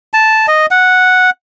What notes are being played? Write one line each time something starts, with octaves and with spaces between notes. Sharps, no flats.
A5
D#5
F#5